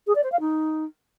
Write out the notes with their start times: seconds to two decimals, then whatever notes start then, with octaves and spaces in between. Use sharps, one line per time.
0.07 G#4
0.15 D5
0.24 C5
0.32 F5
0.40 D#4